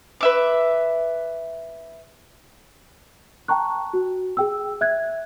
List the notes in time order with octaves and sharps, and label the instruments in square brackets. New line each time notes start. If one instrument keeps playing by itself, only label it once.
[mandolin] B4 E5 D6
[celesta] G5 A5 A#5 C#6 F#6
F#4
G#4 G5 E6
E5 F#6 G#6